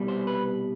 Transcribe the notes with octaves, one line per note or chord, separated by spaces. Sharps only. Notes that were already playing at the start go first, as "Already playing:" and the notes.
Already playing: C2 B2 G3
C5
B4